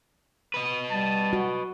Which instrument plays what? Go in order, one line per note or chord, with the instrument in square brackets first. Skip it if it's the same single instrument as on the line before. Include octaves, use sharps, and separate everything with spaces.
[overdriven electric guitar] B4 D#5
[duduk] G3 [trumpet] A5
[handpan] F#4